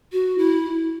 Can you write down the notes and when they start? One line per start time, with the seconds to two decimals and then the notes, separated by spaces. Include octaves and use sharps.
0.12 F#4
0.38 E4